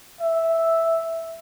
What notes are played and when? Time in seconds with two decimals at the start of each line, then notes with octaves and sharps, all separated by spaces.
0.21 E5